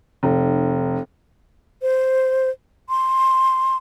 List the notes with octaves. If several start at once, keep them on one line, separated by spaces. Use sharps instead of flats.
F1
C5
C6